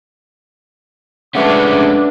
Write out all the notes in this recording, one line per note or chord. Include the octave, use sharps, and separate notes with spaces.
G#3 A3 C#4 D4 B4 E5 F#5 D6